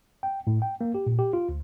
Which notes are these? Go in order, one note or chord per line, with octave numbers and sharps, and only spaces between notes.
G5
A2
G5
A#3
G4
A#2
G4
F4
D2